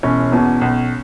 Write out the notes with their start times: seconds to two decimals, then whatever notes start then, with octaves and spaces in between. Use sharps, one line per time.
0.03 E1 C#4
0.32 E2 B2
0.61 B1